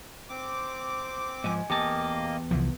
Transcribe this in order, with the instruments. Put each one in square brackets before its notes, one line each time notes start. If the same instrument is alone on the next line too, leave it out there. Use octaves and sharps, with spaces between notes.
[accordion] C4 D6
[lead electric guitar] G#2 F3 [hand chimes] D#5 G#5
[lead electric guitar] E2 A5 [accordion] A#3 D#5 [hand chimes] G4 G5 D6
[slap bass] C2 E3 F3